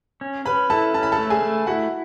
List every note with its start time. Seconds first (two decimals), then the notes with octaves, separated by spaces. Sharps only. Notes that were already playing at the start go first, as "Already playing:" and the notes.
0.21 C#4
0.45 C#4 B4 B5
0.70 E4 A4 A5
0.94 C#4 A5
1.03 B5
1.12 A4 A5
1.18 A3
1.30 G#4 G#5
1.42 A3
1.67 E4 F#4 F#5